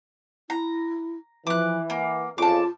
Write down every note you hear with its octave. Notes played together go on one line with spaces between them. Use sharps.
E4 A#5
E3 F3 D6 F#6
A#3 F#5
F2 C#3 F4 A5 D6